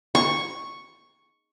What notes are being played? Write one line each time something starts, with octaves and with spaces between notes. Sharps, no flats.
C#6